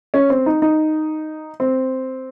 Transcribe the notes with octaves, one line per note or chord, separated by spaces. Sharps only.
C#4
C4
D#4
D#4
C4